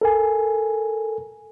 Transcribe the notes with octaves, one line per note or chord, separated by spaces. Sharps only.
A4 A#4 G#5